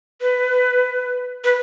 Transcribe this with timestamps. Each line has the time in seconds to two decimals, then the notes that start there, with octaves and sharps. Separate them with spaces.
0.21 B4
1.44 B4